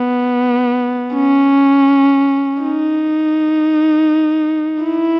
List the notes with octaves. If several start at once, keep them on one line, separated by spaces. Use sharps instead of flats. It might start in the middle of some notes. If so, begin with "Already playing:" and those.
Already playing: B3
C#4
D#4
E4